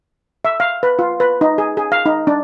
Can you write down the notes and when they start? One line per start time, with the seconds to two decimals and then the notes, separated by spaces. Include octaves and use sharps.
0.45 E5
0.60 F5
0.83 B4
0.99 F4
1.20 B4
1.41 D#4
1.58 G#4
1.77 G#4
1.92 F5
2.06 D#4
2.27 D4